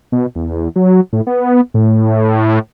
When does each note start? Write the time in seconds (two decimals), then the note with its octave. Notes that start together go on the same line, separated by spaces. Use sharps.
0.12 B2
0.35 E2
0.76 F#3
1.13 A2
1.27 B3
1.74 A2